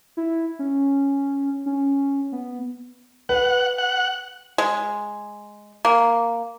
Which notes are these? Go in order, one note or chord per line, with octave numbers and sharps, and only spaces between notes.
E4
C#4
C#4
B3
B4 F#5
F#5
G#3
A#3